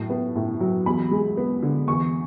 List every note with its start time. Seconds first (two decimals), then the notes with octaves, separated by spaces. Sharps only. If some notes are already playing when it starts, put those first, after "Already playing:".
Already playing: A2 F#3 A5
0.10 B3
0.36 A2
0.60 F#3
0.86 E2 B5
1.11 G#3
1.37 B3
1.63 D3
1.87 E2 C#6